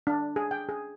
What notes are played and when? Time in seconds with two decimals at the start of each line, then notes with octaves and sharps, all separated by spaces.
0.07 D4
0.36 G#4
0.51 G5
0.69 G#4